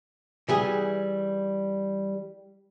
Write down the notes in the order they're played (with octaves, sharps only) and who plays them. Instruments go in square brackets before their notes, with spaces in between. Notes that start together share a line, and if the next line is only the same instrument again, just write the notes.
[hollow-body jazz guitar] E3 G3 G#4